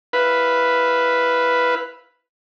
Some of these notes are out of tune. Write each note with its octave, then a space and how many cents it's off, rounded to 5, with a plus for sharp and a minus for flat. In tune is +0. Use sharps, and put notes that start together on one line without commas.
E4 +0 B4 +0 F5 +0